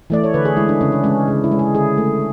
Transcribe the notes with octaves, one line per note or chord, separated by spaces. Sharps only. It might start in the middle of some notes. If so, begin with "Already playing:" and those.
E3 A3 D5
C#5
D3 B4
G#4
G#3 E4
D4
C#3 C#4
D4
G#3 C#4
C#3
E4
G#3
G#4
D3 G#4
A3